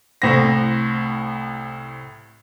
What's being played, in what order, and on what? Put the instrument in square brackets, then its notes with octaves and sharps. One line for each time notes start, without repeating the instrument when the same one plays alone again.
[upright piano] C2 A2 C5 A#6